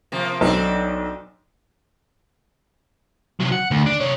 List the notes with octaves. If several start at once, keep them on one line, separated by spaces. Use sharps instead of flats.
C3 F3 A#3
B1 C4 D4 A4
C3 F#3
F#5
D2
D4
C3 C#5